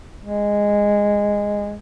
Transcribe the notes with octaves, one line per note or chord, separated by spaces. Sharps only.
G#3